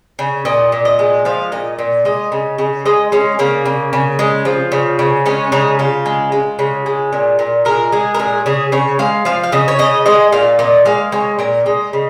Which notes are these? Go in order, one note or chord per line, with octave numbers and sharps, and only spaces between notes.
C#3
A#2 D#5
A#2
D#5
G#3
F3 F5
A#2 D#5
A#2
G#3 D#5
C#3
C#3
G#3 D#5
G#3 C#4
C#3 A#3
C#3
C#3
G#3
F3
C#3
C#3
G#3 C#4
C#3 D#4
C#3 F4
G#3
G#3
C#3
G#3
A#2
A#2
G#3 A#4
G#3 G#4
A#4
A#2 G#4
C#3 G#4
C#3 C#5
G#3 F5
F3 F5
F5
C#3 D#5
C#5
C#3 D#5
G#3 D#5
A#2 F5
A#2 D#5
G#3 F5
G#3 C#5
A#2 A#4
G#3 D#5
C#3